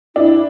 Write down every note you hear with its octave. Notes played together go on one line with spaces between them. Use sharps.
D4 E4